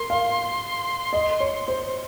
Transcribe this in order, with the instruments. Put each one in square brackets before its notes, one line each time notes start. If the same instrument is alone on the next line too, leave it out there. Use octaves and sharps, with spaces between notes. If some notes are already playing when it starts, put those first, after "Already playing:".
Already playing: [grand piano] A#4 [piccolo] C6
[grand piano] F5
D#5
C#5
C5